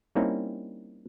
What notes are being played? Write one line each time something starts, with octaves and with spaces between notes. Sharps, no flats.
G3 A#3 C4 C#4 D#4 E4